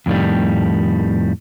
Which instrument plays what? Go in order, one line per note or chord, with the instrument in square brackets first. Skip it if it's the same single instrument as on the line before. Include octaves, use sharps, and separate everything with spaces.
[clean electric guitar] F2 A2 D#3 G3